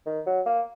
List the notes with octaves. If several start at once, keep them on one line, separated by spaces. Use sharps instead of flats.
D#3
F#3
A#3